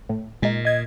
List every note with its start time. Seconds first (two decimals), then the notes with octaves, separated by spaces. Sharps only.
0.09 A2
0.42 A#2 G#3 D#4
0.65 D#5 G#6